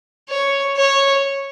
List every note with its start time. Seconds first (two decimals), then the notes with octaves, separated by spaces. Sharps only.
0.29 C#5
0.77 C#5